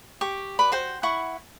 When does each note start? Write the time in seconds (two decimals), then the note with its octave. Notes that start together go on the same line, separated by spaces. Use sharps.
0.21 G4 C#6
0.59 B4 D5 B5
0.72 F#4 C5 G5
1.03 E4 F#5 C#6